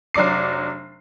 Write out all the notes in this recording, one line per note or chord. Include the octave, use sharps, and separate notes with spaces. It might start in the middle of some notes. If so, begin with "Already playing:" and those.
F1 F#3 D4 D6 C7